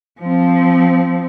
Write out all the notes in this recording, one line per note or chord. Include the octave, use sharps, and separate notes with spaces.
F3 C4